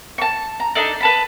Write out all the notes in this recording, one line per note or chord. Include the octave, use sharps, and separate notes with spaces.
A5 C#6
A#5
D4 D#4 A4 D5
B4 A5 B5